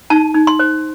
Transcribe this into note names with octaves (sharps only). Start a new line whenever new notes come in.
D#4 A5
D#4
C6
C5